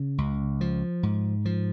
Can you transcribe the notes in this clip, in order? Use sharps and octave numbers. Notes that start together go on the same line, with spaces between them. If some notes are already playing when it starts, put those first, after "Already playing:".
Already playing: C#3
C#2
F3
G#2
F3